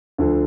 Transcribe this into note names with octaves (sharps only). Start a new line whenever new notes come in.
D2 D3 F3